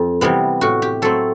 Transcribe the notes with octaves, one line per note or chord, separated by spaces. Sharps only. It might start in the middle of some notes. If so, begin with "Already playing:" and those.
Already playing: F2
C3 E3 G3 B3
A2 F#4
G4
F#3 A3 C4 A4